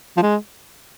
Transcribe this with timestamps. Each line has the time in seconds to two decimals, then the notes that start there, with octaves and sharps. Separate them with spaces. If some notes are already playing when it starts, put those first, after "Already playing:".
0.17 F3
0.22 G#3